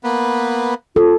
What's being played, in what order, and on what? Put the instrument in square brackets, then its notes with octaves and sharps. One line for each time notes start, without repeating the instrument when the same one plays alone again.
[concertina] A#3 B3 B4
[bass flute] F4 [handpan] A4